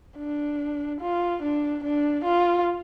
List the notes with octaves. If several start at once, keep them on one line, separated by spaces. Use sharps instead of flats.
D4
F4
D4
D4
F4